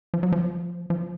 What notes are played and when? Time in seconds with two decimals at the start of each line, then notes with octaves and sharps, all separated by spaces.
0.14 F3
0.23 F#3
0.32 F3
0.90 F3